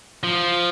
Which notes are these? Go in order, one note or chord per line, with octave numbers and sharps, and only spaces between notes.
F3